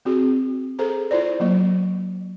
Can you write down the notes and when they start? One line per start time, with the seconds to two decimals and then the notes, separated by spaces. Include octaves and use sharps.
0.05 C4 F#4 G#4
0.79 G#4 A4 C5 A#5
1.11 E4 F4 C5 D5
1.40 F#3 A#3 C#6